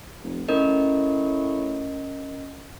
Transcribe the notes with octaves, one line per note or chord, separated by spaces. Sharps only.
F1
A2 C#4 A#4 D#5